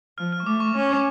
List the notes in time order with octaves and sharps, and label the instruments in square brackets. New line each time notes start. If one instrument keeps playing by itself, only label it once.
[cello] F3 [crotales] F6
[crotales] F6
C#6
[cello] A3 [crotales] D6
[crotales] C#6
[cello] C#4